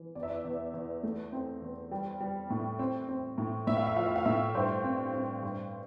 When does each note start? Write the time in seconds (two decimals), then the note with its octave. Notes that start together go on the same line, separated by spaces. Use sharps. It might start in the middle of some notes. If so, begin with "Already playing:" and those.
Already playing: E3
0.15 E2 D5
0.23 E5
0.30 D5
0.45 E2
0.74 E2
1.03 A3
1.32 C4
1.62 E2
1.91 G3
2.20 G3
2.50 A2
2.79 C4
3.08 C4
3.38 A2
3.67 A2 E5
3.77 F5
3.86 E5
3.96 F3 F5
4.06 E5
4.16 F5
4.26 A2 E5
4.55 G2 C5
4.84 C4
5.14 C4
5.43 G2